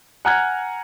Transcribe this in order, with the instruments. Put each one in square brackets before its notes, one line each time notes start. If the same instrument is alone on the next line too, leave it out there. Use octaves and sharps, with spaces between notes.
[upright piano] F#5 G#5 A#5 F6 F#6 G#6